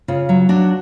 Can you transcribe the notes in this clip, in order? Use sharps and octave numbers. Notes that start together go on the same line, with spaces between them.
C#3 F4
F#3
F#3 D4 F#4